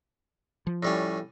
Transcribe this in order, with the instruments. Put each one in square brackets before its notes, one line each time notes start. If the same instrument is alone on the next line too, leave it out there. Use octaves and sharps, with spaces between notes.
[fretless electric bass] F3
[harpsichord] A2 G3 C#4